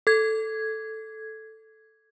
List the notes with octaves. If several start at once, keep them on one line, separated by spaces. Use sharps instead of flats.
A4 G#6